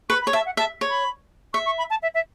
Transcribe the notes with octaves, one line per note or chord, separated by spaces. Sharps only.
B4 C#6
B5
C#5
E5 A5
F#5
E5 A5
C#5
B5
E5 C#6
C#6
B5
A5
E5
E5